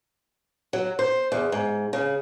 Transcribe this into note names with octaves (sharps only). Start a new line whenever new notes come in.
F#3
C5
E2
G#2
C#3